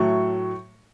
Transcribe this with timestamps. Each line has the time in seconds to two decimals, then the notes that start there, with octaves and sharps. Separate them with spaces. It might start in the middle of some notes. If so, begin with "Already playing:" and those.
Already playing: A2 F#3 A3 C#6